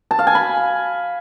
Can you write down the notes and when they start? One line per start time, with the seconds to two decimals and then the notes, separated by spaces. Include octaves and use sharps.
0.11 A5
0.19 F5
0.27 G#5
0.35 B5